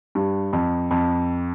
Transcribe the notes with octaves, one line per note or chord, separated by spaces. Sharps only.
G2
F2
F2